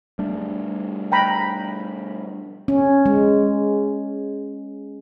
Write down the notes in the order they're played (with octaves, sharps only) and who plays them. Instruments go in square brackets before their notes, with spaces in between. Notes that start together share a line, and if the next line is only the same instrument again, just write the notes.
[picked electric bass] G3 A3 D4
[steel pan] G5 A#5 B5
[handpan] C#4
G#3